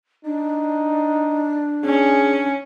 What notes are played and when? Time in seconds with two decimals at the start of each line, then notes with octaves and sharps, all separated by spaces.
0.25 D4 D#4
1.85 C#4 G#4